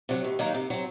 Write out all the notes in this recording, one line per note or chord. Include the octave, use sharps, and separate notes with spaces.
C3 F#3
D#2
D#3 F#3 A#3 D#4
C3
F#3 C4